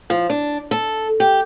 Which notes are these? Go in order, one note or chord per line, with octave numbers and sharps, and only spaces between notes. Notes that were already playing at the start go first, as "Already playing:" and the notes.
F3
D4
A4
G4